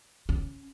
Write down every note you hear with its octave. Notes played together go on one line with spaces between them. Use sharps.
C#4